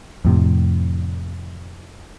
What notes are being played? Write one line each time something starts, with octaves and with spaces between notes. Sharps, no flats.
F2 A2 C3